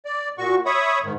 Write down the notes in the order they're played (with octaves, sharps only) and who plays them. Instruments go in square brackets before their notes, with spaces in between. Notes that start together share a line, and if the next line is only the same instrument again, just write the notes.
[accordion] D5
A#2 F#4 C#6
C#5 E5 B5 C#6 D#6
G#2 D#3